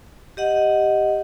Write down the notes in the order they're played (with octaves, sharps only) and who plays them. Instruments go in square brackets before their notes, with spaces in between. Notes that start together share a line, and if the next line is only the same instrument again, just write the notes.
[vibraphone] G4 D#5 F#5